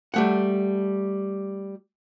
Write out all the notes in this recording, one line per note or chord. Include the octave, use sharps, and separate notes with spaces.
G3 A3 F#5